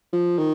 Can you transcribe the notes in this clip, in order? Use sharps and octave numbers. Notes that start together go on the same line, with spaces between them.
F3
D#3